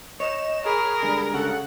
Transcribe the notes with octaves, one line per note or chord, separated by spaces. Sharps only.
C#5 D#5 E7
G#4 A#4 B5
D3 G3 G#3
C#3 A4 F#5